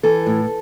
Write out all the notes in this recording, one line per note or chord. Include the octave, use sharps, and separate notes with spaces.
E3 A4
A2